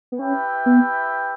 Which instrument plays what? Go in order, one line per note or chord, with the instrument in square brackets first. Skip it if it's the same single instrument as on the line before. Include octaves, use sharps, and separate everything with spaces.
[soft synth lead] B3
[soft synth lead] C#4 [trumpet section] E4 G4 B4 E5 G5
[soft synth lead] B3